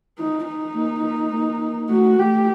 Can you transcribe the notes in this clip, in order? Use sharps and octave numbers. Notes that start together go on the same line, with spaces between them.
D#4
D#4
A#3
A#3
A3 F#4
A3 G4